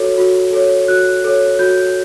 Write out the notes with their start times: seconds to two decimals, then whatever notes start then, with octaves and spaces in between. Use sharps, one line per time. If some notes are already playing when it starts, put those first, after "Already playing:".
Already playing: F#4 A4 C#5
0.18 F#4
0.53 A4 C#5
0.88 F#4 F#6
1.24 A4 C#5
1.59 F#4 G6